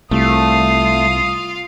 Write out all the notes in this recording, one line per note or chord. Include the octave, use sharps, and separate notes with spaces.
C2 A3 F4 F5 D#6